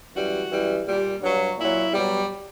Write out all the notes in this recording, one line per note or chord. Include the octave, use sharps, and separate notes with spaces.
F#2 E3 G3 F#4
F#2 E3 G3
A#2 G3
G2 F#3
A#2 F#3 E4
B2 F#3 G3